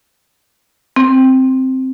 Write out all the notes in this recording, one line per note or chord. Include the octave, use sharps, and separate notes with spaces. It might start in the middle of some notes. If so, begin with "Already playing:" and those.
C4